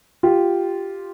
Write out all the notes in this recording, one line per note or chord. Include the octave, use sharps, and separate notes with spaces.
F4 G4